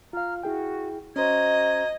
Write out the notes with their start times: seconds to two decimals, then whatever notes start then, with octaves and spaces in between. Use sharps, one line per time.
0.13 F4 F5 A#5 F6
0.43 E4 F#4 G#4 G5
1.16 C#4 F#4 C5 D#5 A#5 G#6